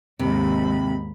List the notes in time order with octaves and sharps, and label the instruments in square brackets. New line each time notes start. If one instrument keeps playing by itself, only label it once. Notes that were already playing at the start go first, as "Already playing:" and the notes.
[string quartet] D#2 G#2 B5 [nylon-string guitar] C3